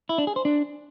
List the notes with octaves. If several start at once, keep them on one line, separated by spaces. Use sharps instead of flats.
E4
D4
G#4
C5
D4